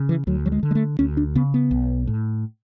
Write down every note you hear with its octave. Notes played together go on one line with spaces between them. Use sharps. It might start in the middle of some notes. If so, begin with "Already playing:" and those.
Already playing: C#3
E3
D2 F#3
F#3
G#3
D3
G#3
A3
D2 C#4
D4
C#3 B3
B3
B1
A2